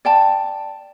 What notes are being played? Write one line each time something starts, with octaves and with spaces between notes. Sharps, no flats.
D5 G5 A5